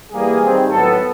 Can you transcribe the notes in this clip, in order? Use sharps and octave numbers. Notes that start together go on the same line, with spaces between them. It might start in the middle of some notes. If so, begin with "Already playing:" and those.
E3 G3 A#3 G#4
D#3 G3 C4
A2 F#3 B3 A4